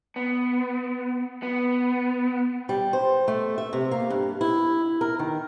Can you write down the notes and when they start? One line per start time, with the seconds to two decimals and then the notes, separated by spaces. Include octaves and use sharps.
0.16 B3
1.43 B3
2.69 G3
2.93 C5
3.28 A3
3.58 E5
3.73 C3
3.91 A#3
4.10 G2
4.41 E4
5.01 A#4
5.19 D#3